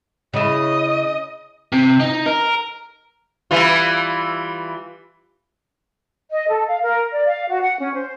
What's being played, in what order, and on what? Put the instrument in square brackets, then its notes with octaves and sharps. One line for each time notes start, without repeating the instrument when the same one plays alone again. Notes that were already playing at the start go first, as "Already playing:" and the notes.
[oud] C#3 E4 [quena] D#5
[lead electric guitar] C3
D#4
A#4
[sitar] E3 G3 F4
[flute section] D#5
A4
F5
A#4
D5
F5
F#4
F#5
C#4
C5